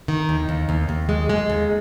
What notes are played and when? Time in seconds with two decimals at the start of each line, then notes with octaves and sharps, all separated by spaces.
0.08 D#3
0.29 D#2
0.49 D#2
0.69 D#2
0.89 D#2
1.09 G#3
1.30 G#3
1.50 D#2